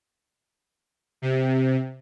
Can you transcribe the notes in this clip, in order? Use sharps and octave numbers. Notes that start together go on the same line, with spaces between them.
C3